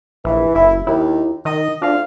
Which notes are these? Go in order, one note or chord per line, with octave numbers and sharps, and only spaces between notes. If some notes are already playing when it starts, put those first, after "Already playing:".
A#1 E3
F#1 E4
D#2 E4
D#3 D#5
D2 D4 F4 F5